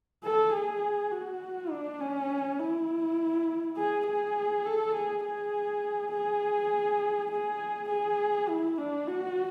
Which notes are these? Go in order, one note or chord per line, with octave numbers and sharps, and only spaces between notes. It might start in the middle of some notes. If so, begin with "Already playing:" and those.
A4
G#4
F#4
D4
C#4
E4
G#4
G#4
A4
G#4
G#4
G#4
G#4
G#4
E4
D4
F#4